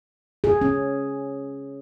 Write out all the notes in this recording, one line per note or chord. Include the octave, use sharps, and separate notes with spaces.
G#4
C#4